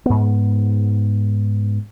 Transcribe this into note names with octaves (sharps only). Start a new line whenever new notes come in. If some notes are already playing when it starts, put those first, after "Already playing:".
G#2 B3